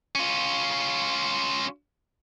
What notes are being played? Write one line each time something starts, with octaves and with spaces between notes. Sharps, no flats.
C#4 F4